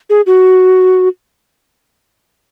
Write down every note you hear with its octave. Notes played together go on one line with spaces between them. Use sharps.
G#4
F#4